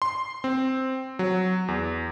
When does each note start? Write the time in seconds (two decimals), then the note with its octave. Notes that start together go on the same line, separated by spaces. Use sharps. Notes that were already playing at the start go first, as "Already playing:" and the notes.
0.02 C6
0.44 C4
1.19 F#3
1.68 E2